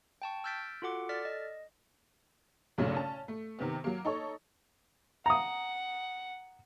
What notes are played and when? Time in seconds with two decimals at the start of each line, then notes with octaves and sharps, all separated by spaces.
0.22 G5 A5 C#6
0.44 E6 F6 G6 A6 B6 D7
0.82 F4 F#4 A4 F#5 D6
1.09 A4 D5 F6 A6 B6
1.25 D#5
2.78 B1 G2 A#2 C#3 F#3 A3
2.94 C#4 A5
3.28 A3
3.59 C3 D#3 B3
3.84 F#3 A#3
4.05 D#4 A4 C#5
5.26 F#5 A#5 D#6